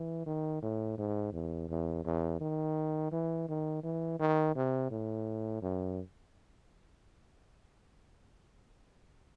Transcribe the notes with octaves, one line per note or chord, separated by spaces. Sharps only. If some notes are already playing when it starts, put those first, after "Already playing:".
Already playing: E3
D#3
A2
G#2
E2
E2
E2
D#3
E3
D#3
E3
D#3
C3
A2
F#2